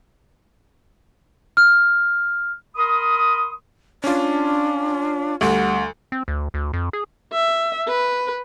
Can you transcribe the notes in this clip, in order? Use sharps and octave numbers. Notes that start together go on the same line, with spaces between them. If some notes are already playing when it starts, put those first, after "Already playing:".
F6
A#4 B5 C6 D#6
C#4 D4 F4
D2 G3 F#5
C4
D2
D2
F2
G#4
E5
B4